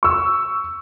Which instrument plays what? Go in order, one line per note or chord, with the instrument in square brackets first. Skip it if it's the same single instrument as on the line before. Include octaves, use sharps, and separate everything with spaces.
[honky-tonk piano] C#6 E6